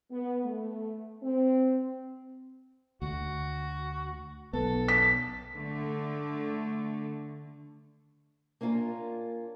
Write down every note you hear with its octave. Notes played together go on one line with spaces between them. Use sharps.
B3
A3
C4
D2 F#4
B1 B3 A4
B6
D3 A3
A#3 C#4 D4 F4 A#4